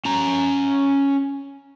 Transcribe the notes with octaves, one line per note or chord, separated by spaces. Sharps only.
C#4 A#5